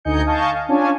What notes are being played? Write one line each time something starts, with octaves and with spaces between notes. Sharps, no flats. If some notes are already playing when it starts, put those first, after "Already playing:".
D2 D#4 D#5 G#5 G6 C#7
D#5 F5 G#5 A5 C#6 G6
F5
C#4 D4 F4 C#5 G#5 A5